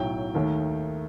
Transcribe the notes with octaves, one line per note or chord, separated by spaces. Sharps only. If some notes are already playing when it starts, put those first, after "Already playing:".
Already playing: B1 A2 F#3 G5
D#2 D#3 A3